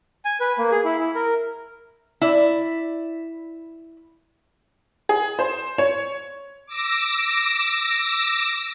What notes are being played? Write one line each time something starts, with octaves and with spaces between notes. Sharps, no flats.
G#5
B4
A#3
G#4
E4
E4
A#4
E4 D5
G#4
C5
C#5
D6 E6 A#6